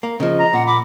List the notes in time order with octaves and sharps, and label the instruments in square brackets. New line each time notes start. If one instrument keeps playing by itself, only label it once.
[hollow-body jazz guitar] A#3
[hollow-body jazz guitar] C#3 F3 [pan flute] D#5
[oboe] A#5
[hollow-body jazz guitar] A#2 [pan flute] F#5
[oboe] B5 [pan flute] D6